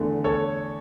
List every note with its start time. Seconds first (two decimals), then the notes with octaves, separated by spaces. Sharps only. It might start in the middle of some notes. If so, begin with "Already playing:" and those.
Already playing: E2 D3 A3
0.24 A4 C#5